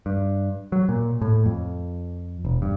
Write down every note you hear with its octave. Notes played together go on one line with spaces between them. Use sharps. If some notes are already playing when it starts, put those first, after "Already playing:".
G2
F#3
A#2
A2
F2
E1
G2